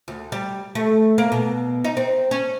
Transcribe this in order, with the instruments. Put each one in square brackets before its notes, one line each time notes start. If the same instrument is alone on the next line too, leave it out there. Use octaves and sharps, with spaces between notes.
[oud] D2
G3
A3
A#3
B2
D#4
C4
C#4